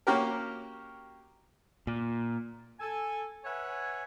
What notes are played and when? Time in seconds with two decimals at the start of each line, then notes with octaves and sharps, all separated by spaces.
0.07 A#3 C#4 F#4 G4 A#4
1.87 A#2
2.80 A4 G#5
3.45 B4 C#5 E5 F#5 G#5